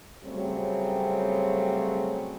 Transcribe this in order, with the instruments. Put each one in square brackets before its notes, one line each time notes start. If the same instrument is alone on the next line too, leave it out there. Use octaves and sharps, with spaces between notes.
[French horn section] C#3 F#3 G3 A3 C4